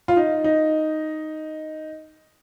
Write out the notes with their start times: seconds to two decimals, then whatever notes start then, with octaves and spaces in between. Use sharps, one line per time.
0.08 F4
0.16 D#4
0.44 D#4